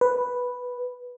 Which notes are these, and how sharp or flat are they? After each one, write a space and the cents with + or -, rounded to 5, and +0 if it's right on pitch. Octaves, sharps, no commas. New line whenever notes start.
B4 +0